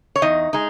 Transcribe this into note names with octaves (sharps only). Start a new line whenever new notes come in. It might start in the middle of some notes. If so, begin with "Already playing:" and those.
C#5
E2 D#4 D#5
G#3 D#4